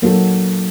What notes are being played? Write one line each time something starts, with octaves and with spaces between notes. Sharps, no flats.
F#3 A#3 D#4 F#4 A4